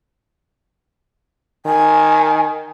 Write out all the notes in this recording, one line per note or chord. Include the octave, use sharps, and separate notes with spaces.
D#3 G#5